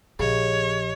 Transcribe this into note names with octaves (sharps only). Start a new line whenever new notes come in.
A#1 C#3 F3 G4 C#5 D#5